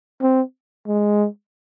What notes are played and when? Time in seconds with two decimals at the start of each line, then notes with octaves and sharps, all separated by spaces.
0.22 C4
0.88 G#3